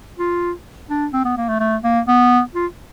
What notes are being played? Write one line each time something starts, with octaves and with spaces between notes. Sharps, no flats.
F4
D4
C4
B3
A#3
A3
A3
A#3
B3
F4